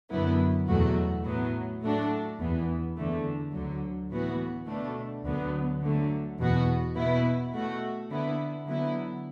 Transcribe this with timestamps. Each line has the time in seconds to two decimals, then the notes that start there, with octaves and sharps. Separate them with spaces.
0.11 F#2 D3 F#3 B3 E4
0.68 E2 B2 F#3 A3 F#4
1.25 A2 F#3 B3
1.82 A2 A3 D4 F#4
2.39 E2 E3 B3
2.96 E2 D3 A3
3.53 D2 D3 F#3
4.10 A2 E3 B3 F#4
4.67 B2 A3 D4
5.25 D2 D3 F#3 B3
5.82 D3 F#3 A3
6.39 E2 B2 B3 F#4
6.96 B2 B3 E4
7.53 B2 A3 F#4
8.10 D3 B3 E4
8.67 D3 F#3 B3 E4